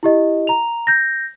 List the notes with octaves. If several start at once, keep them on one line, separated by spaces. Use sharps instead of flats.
E4 G4 D#5
A#5 F7
G6 A#6